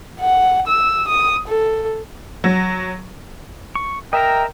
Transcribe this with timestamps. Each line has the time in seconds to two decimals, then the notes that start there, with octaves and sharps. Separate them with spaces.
0.20 F#5
0.67 E6
1.08 D#6
1.48 A4
2.44 F#3
3.75 C#6
4.13 A#4 D#5 E5 G5 A#5